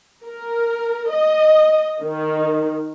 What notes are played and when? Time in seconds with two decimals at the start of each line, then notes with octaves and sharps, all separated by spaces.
0.24 A#4
1.12 D#5
2.03 D#3